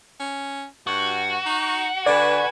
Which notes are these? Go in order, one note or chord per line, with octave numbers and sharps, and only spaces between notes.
C#4
G2 F#4
D#4
D3 B4 D5 G#5